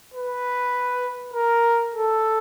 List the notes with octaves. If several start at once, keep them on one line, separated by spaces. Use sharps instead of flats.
B4
A#4
A4